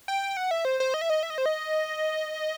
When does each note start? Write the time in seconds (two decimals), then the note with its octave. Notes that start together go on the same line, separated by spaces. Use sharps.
0.08 G5
0.37 F#5
0.51 E5
0.65 C5
0.80 C5
0.94 D#5
1.01 E5
1.10 D#5
1.23 E5
1.30 D#5
1.38 C5
1.46 D#5